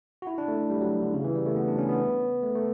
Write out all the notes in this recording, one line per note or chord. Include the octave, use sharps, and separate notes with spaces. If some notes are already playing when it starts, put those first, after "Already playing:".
F#4
E4
D4
A3
G3
F#3
D3
C#3
E3
G3
A3
B3
D4
C#4
B3
A3
A3